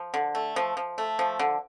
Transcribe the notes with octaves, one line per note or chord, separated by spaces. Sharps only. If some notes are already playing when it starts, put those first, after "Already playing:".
Already playing: F3
D3
A3
F3
F3
A3
F3
D3